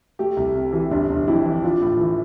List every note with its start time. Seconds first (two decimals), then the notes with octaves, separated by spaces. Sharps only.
0.19 A3 G4
0.37 C2
0.55 C3
0.72 E3 G4
0.91 G1 D4
1.10 G1
1.27 F2 E4
1.45 E3
1.63 D4 F4
1.82 A2
2.00 E3